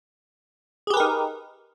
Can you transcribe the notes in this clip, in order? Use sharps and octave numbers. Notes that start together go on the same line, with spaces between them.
D#4 G4 G#4 A#4 B4